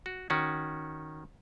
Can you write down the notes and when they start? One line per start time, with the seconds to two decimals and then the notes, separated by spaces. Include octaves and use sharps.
0.06 F#4
0.30 D#3 C#4 F#4